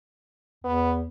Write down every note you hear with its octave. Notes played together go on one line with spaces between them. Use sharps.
E2 B3